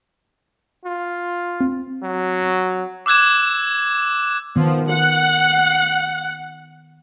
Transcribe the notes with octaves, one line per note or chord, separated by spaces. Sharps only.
F4
C4
F#3
D6 E6 F#6 G#6 E7
D#3 F3 B3
F#5